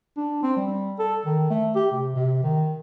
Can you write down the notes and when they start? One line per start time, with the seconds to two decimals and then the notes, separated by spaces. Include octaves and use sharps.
0.17 D4
0.43 C4
0.57 G3
0.99 A4
1.26 D#3
1.50 A3
1.75 G4
1.92 C3
2.16 C3
2.43 D#3